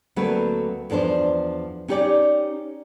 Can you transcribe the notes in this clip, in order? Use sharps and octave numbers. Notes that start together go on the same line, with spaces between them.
D2 F#3 A3 A#3 C4 B4
E2 F3 D4 A#4 C5
C#4 D#4 G4 C#5 D5